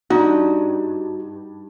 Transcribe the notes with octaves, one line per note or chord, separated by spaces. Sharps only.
G2 D#4 F#4